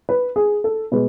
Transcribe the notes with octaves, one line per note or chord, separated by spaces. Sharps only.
B4
G#4
A4
B2 G#3 B4